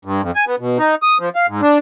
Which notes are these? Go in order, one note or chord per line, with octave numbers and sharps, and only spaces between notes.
G2
F2
G#5
B3
B2
D#4
D#6
F3
F5
G#2
D4